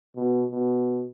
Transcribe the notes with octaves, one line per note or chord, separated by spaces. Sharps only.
B2
B2